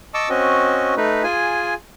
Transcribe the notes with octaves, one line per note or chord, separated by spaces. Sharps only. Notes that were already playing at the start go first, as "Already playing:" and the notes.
D#5 A5 C#6 D6 E6
C4 C#4 F#4 D#5
A3 D#4 B4
F4 G#4 G#5